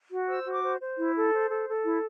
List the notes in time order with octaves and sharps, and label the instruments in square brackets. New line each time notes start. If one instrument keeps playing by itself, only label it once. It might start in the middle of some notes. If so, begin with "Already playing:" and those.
[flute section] F#4
C5 E6
F#4
D6
C5
C5
E4
A4
C5
A4
A4
E4